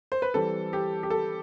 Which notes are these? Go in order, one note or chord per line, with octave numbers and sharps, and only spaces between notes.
C5
B4
E3 G3 C4 A4
G4
G4
A4